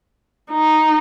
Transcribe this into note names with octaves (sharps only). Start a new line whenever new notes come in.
D#4